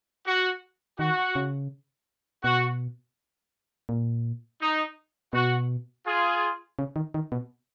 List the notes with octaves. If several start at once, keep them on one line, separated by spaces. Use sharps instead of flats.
F#4
D#3 F#4
C#3
B2 F#4
A#2
D#4
B2 F#4
F4 G#4
C#3
D#3
D#3
B2